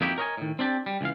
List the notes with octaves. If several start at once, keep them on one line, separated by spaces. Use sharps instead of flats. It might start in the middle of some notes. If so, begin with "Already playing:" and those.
F2 A#3 D#4 E4 F#4 G4
A#4 C#5 D#5 F#5 G#5
A2 D#3
C4 D4 G4 A5
G3
C#2 E3 F5